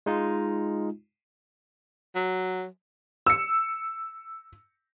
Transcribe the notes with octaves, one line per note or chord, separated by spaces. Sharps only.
G#3 D#4 F4
F#3
E6 C#7